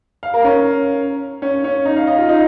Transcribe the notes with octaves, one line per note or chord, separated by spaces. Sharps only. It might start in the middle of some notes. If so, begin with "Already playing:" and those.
F5
A#4
C#4
C#4
C#4
D#4
F5
D#5
F4
D#4